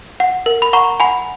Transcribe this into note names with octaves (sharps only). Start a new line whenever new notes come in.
F#5
A#4
B5
F#5 A#5 C#6
F#5 G#5 B5